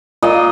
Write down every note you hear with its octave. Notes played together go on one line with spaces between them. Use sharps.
A#2 D#5